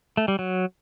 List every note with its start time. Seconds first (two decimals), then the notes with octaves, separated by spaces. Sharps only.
0.17 A3
0.28 G3
0.39 F#3